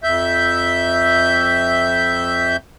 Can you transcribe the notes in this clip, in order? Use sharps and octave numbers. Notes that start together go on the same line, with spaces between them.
F2 E5 G6